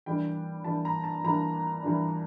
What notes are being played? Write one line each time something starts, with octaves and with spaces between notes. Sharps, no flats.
E3 G3 A#3 D4 G5
E3 G3 A#3 D4 A5
A#5
A5
E3 G3 A#3 D4 A#5
E3 G3 A#3 D4